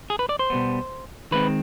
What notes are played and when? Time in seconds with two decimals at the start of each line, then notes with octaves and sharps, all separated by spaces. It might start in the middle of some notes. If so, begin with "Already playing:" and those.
0.10 G#4
0.19 B4
0.29 D5
0.39 C5
0.50 B2 G3 B3
1.31 D#3 G#3 C4 B4